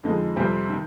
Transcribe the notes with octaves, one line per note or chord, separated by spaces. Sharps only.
F2 D3 F3 G#3 D#4
F2 C3 G3 C4
D#3